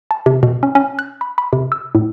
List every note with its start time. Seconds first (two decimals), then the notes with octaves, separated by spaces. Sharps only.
0.11 A5
0.26 C3
0.43 B2
0.63 C#4
0.75 C#4
0.99 F#6
1.21 B5
1.38 B5
1.53 C3
1.72 E6
1.95 A2